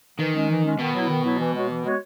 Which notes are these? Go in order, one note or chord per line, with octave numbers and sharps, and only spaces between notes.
D#3 E3
G#3 C#4
E3
G#3 C#4
B2 D#3
F#3 B3 E4
D#3
F#3 B3 E4
E3
G#3 B3 F#4 C#5
E3
G#3 B3 F#4 C#5